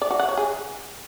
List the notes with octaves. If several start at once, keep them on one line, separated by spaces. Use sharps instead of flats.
D5
F#4
F#5
C#5
G#4